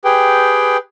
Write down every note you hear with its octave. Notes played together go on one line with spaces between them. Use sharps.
G4 G#4 B4 G5